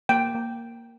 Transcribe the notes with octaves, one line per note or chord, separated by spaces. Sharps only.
A#3 G5
A#3